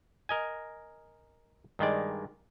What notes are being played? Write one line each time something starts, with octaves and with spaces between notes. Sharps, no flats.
A#4 D#5 G#5
G2 D#3 G#3 D5